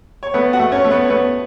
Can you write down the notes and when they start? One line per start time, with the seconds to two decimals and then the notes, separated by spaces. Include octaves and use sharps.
0.23 C#5
0.34 A3 B3 B4
0.53 F#4 F#5
0.59 A3
0.72 C#4 C#5
0.84 A3
0.91 B3 B4
1.05 C#5
1.10 A3 B3 B4